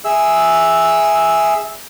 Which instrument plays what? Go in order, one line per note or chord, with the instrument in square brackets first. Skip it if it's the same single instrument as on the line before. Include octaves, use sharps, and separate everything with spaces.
[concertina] G#4 E5 E6